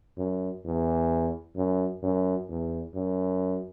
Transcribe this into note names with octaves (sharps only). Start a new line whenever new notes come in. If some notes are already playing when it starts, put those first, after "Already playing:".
F#2
E2
F#2
F#2
E2
F#2